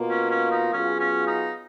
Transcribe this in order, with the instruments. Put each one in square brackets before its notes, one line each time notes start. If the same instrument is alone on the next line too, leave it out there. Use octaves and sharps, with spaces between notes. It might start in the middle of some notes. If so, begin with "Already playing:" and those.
Already playing: [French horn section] B2 A#3 F4
[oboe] C#4
C#4
D#4
[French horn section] F#3 B3 F4 G#4 [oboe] C#4
[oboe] C#4
D#4